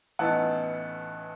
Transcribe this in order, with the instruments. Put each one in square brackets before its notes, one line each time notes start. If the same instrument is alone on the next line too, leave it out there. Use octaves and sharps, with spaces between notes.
[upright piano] A1 A2 E3 B3 D#4 F#5 A5